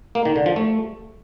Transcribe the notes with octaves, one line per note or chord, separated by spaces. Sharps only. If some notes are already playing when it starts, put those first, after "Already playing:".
A#3
D#3
D3
F3
A3